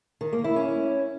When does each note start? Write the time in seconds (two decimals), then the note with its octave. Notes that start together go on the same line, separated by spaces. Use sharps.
0.21 D#3
0.33 A#3
0.44 E4
0.56 C#4